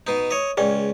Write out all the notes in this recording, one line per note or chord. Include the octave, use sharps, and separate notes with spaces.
B2 D#4
C#5 D#5
C#2 C#4 G#4 D5 G5